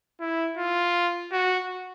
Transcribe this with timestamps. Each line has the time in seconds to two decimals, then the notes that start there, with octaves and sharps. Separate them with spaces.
0.20 E4
0.58 F4
1.32 F#4